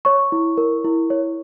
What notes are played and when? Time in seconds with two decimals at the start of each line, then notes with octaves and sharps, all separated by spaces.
0.05 C#5 C#6
0.32 E4
0.57 A#4
0.85 E4
1.10 C#5